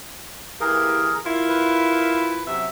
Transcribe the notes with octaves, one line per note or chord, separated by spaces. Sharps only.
E3 A#3 G4 G#4 A#4
E4 F4 A#4
B4
F#2 C3 E5